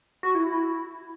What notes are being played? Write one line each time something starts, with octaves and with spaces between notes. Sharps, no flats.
F#4
E4